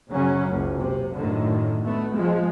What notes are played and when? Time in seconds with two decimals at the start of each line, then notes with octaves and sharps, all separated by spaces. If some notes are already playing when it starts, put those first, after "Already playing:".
0.10 F#2 C#3 F#3 C#4
0.49 F#1 C#2
0.78 C3
1.13 F#2 A2 D3 D#3
1.85 A3 B3
2.13 F3 G#3